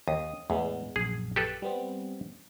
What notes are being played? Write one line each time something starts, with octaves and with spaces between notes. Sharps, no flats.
D#2 D#6
E2 A2 G#3 B3
A#1 F#2 G#4
G4 A4 B4
G3 B3 C4